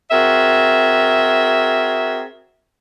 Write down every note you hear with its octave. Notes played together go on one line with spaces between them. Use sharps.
C4 F#4 G#4 A#4 E5